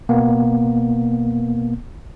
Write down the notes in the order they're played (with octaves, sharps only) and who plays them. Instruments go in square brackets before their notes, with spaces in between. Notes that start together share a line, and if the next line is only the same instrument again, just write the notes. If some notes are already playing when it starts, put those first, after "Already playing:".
[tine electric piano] B2 A#3 B3